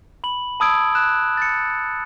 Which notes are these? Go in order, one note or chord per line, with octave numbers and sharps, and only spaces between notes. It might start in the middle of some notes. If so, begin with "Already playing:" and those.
B5 F#7
A5 B5 D#6 E6 G#6 D7
F#6 E7
A6 C#7